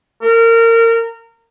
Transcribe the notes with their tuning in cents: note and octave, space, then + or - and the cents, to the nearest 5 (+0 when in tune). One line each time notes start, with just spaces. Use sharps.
A#4 -25